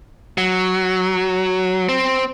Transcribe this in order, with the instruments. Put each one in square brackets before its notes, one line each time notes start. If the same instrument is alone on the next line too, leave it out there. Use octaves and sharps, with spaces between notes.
[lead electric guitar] F#3
C4